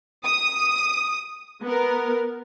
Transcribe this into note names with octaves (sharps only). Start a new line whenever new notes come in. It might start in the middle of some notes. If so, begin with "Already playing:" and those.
D#6
B3 A#4